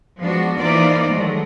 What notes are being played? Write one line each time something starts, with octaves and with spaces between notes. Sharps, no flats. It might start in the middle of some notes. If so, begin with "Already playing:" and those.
F3 G#3 B3 D4 F#4
E3 A#3 D#4 F4 C5 D5
D#3 F#3 G#3 A3